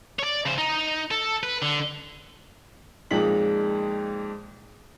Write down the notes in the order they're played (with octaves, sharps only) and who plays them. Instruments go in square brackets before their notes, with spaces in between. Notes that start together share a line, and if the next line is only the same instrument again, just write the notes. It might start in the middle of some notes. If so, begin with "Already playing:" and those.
[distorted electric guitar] C#5 D5
C#3 C5
D#4
A4
B4
D3
[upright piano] F2 A#2 G#3 D#4 B6 F#7